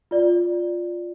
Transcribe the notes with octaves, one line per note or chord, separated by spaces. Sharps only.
F4 D5